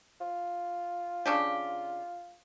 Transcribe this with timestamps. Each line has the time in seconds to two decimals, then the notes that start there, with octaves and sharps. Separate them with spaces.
0.21 F4
1.26 C#3 D4 G4